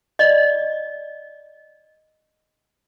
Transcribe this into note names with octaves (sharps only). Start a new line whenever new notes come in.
D5 D#5